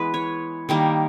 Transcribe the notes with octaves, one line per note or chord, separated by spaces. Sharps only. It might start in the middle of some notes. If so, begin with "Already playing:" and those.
Already playing: E3 G#3 B3 B4
C#5
D#3 G3 A#3